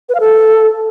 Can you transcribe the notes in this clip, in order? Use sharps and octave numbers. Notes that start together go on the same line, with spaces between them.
B4
F5
A4